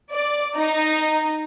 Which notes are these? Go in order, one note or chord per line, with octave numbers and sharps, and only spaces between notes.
D5
D#4